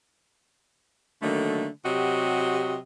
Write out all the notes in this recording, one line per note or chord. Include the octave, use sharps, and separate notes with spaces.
D3 D#3 F#3 A3 A#3
C3 F#3 F#4 G4 D#5